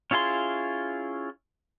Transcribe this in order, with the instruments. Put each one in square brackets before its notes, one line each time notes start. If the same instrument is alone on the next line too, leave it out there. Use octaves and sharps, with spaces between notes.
[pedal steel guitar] C#4 E4 F4 G#4 C6